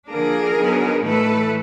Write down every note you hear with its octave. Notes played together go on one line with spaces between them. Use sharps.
D3 F3 A#3 D4 G#4 A#4
D3 F#3 B3 D#4
A2 E3 A3 A4 B4